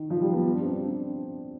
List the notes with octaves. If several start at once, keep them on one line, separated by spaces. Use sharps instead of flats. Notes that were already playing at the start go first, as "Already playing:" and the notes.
Already playing: D#3
F3
G3
B3
D4
C4
D4